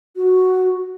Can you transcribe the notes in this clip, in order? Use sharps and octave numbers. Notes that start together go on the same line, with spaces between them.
F#4